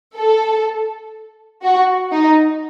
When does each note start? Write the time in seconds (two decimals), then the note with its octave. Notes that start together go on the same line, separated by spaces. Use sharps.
0.16 A4
1.64 F#4
2.12 D#4